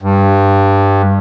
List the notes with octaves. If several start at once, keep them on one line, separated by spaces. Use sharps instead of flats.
G2